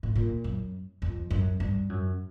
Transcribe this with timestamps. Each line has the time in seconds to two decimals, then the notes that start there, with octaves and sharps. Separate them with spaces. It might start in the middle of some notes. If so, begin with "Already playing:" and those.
0.03 A2
0.15 A#2
0.44 F#2
1.02 F2
1.30 F#2
1.60 G2
1.89 F#2